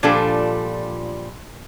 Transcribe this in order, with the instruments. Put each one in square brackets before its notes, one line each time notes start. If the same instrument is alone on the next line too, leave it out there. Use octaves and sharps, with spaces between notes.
[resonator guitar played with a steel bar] A#2 F3 G3 D4 A4